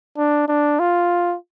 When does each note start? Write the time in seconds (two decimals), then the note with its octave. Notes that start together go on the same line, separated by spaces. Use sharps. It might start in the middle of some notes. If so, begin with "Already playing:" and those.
0.18 D4
0.48 D4
0.80 F4